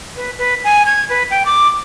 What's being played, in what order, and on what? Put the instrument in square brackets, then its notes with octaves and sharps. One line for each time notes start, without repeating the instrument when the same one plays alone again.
[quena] B4
B4
G#5
G#6
B4
G5
D6